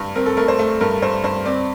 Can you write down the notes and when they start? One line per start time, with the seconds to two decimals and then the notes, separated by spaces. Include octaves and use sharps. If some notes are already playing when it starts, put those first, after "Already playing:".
Already playing: G2
0.16 C4 A#4
0.26 A4
0.37 A3 A#4
0.48 C5
0.59 A3
0.81 G2 A#4
1.02 G2 C5
1.24 G2 C5
1.46 C4 D5